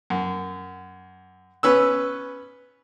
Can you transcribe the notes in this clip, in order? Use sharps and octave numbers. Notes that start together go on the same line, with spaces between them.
F#2
B3 C#4 B4 E6